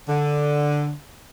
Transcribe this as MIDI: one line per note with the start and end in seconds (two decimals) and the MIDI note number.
0.08 0.92 50